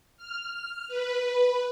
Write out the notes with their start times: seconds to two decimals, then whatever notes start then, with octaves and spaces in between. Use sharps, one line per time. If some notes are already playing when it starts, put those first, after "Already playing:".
0.17 F6
0.88 B4